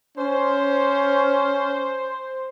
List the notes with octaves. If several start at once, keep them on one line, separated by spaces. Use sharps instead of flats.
C#4 C5